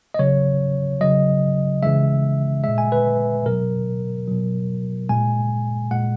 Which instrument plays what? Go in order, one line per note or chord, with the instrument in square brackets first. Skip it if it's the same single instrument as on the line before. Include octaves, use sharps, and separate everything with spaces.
[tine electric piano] D#5
C#3 F#3 C#5
C#3 F#3 D#5
C#3 E3 G#3 E5
A#2 G#3 E5
G#5
B4
B2 F#3 A#4
B2 F#3
A#2 G#3 G#5
A#2 G#3 F#5